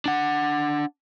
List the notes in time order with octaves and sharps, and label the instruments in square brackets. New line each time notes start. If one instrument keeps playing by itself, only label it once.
[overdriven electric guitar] D4 F#5